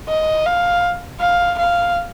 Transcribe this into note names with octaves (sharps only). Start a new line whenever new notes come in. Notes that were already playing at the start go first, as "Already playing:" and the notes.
D#5
F5
F5
F5